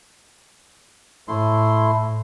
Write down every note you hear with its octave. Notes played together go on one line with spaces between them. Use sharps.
A2 A3 E4 C6